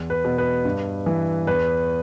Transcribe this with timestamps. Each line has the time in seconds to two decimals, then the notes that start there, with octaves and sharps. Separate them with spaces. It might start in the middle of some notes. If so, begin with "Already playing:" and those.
Already playing: E2
0.10 B4
0.25 B2
0.38 B4
0.65 G2
1.06 E3
1.47 E2 B4